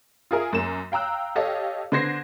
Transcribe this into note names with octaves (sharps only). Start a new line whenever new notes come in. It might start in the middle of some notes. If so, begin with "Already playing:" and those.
F4 G#4 A#4 E5
F#2 A#3 E7
F5 G5 A#5 E6 F#6
G4 A4 C#5 D#5 F5
D3 B3 C5 G#6 A#6 C7